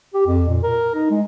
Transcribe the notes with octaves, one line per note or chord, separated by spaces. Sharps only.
G4
F2
A#2
A#4
D#4
G#3